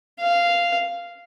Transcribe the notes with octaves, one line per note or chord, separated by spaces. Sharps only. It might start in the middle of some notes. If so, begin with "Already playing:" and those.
F5